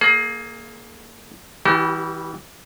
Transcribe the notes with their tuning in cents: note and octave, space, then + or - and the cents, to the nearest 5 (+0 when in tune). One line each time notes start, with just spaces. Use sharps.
A#3 +0 G#4 +35
E3 -25 G3 +0 G4 -45